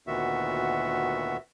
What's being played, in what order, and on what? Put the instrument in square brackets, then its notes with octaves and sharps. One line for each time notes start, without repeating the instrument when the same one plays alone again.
[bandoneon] D2 A#2 D#3 B3 F#4 E5